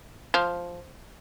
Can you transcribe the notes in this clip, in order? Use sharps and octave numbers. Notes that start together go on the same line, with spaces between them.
F3